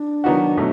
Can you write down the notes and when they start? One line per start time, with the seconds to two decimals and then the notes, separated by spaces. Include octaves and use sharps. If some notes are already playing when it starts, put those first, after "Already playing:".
Already playing: D4
0.24 D#3 F#3 B3 D#4 F#4
0.57 B2 F#3 A3